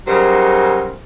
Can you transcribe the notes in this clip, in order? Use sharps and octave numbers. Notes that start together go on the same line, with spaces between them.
C#3 F#3 G3 D#4 A#4 C5